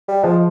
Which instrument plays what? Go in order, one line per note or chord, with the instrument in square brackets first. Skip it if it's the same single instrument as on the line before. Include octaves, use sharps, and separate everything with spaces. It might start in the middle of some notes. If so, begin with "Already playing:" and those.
[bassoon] G3
[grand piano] F3 [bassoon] G#3